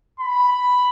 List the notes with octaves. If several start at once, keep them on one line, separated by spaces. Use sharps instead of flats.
B5